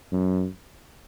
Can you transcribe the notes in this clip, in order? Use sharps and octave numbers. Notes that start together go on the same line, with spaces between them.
F#2